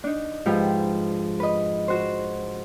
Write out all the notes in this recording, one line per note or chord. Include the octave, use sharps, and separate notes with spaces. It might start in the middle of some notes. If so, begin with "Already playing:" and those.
D4 D#4
G#2 F3 G4 B4
B4 D#5
F#4 C5